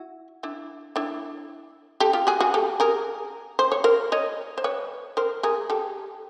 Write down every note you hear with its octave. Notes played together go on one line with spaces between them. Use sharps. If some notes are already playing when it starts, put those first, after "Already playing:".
Already playing: E4 F#4
D4 E4
D4 E4
G4 A4
F4 G4
F#4 G#4
F#4 G#4
G4 A4
G#4 A#4
C5
C#5
A#4 C5
C#5 D#5
C5
B4 C#5
A#4 C5
G#4 A#4
G4 A4